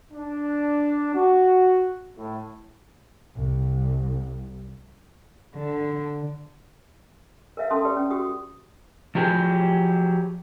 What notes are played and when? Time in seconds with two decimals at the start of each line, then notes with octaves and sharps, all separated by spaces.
0.13 D4
1.15 F#4
2.17 A2
3.36 C2
5.55 D3
7.57 A#4 B4 E5 F5
7.70 C#4 A4 A5 C6 D#6
7.85 G4 B4 D5
7.97 C#4
8.10 F#4 G4 D#6
9.15 F3 F#3 G4 G#4